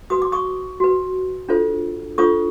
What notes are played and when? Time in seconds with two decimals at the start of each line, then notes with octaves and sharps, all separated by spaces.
0.10 F#4 B4 D#6
0.22 D6
0.32 C#6 D#6
0.80 F#4 B4
1.49 D4 F4 A4 C5
2.18 D4 F4 A4 C5 C#6 D#6